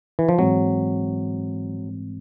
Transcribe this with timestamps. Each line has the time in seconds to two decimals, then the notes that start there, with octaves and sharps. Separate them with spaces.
0.19 E3
0.29 F3
0.39 G#2 E3 F#3 G#3 C4